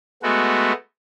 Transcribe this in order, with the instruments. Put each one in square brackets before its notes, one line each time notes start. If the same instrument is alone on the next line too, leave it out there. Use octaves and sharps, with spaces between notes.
[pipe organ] G#3 A3 B3 F#4